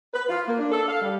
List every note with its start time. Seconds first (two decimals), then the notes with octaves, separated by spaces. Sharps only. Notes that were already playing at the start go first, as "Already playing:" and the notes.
0.14 B4
0.29 F4
0.48 A#3
0.59 D4
0.72 A4
0.88 F5
1.02 G3